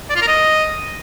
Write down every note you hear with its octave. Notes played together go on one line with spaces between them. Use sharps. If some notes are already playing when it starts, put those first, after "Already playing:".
D5
F4
A#4
D#5